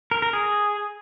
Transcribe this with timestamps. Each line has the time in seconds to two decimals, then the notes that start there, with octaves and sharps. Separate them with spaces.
0.11 A#4
0.22 A#4
0.33 G#4